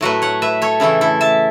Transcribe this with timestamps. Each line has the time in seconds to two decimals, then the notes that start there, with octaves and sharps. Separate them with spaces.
0.01 A2 F#3 A3 F#4 B4
0.22 C#5 F#5
0.42 B4 E5
0.62 A4 C#5
0.80 C#3 E3 A3 E4 A4
1.01 E4 A4
1.21 E5 A5